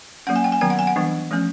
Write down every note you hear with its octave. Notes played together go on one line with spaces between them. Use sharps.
F#3 A#3 C#4 F#5
G#5
G5
G#5
D#3 F#3 B3 G5
F#5
G#5
F#5
E3 G3 B3 D4
F3 A3 C#4